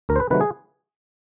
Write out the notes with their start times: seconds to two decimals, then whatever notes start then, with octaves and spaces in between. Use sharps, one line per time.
0.09 D2 A#4
0.16 C5
0.20 B4
0.30 C3 D#3 F#3 A3 B4
0.41 G#4